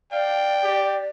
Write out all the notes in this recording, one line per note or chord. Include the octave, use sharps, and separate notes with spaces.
D5 F5 G5
G4